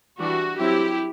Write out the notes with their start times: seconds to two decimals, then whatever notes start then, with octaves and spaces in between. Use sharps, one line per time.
0.19 E3 G3 D4 F#4
0.57 F#3 C4 E4 G4